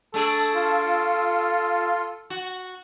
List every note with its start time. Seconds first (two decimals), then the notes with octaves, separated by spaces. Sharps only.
0.14 A3 D4 G#4 A4
0.55 F4
2.30 F#4